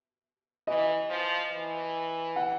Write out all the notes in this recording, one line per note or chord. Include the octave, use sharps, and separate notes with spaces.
E3 D#5
F3
E3
F#5